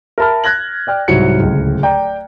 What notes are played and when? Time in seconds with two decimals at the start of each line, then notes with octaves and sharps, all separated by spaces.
0.18 A#4 E5 A5 B5 F6
0.44 F#6 G#6 A#6 F#7
0.87 D5 G5 F6
1.08 C2 G#2 F#3 C#7
1.40 D1 C#2
1.83 D5 G5 A#5